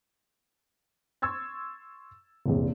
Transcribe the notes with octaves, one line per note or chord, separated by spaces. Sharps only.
C6 C#6 E6 G#6 A6
F1 A#1 E2